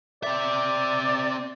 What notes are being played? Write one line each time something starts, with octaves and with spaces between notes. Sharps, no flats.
C4 D5 E5